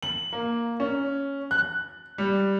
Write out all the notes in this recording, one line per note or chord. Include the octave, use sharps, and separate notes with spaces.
F#7
A#3
C#4
F#6
G3